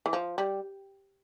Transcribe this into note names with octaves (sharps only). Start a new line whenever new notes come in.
E3
F3
G3